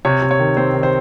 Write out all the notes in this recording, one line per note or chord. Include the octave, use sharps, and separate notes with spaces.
C3 C#5
C3
C#5
D#3
C4 C5
D#3
C5